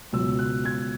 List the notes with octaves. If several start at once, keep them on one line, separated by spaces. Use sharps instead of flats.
C#2 B2 F#3 E6
F#6
G#6